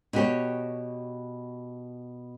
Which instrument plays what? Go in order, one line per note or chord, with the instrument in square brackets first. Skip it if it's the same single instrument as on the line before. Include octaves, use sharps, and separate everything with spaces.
[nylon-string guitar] B2 F#4 G4 C#5